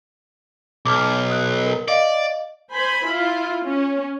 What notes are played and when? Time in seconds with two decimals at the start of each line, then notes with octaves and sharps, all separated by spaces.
0.85 B1 D6 F6
1.30 D#6 F#6
1.66 A#4
1.88 D5 D#5 F5
2.72 C5 G#5 B5
3.06 E4 F4
3.63 C#4